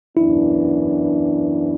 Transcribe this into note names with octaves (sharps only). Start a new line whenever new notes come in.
F#2 E3 B3 D4 E4